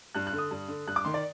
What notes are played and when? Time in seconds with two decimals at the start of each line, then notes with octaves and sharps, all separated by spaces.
0.15 G2 F#6
0.27 F#6
0.33 D3
0.38 D#6
0.51 G2
0.68 D3
0.88 G2 F#6
0.96 D6
1.05 D#3 C6
1.14 D5